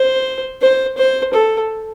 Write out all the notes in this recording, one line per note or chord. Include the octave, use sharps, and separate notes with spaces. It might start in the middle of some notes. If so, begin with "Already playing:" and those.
Already playing: C5
C5
C5
A4